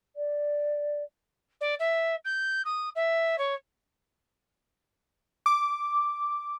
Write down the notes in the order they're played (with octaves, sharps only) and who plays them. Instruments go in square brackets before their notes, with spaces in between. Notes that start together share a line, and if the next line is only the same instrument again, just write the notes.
[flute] D5
[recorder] D5
E5
G6
D#6
E5
C#5
[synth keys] D6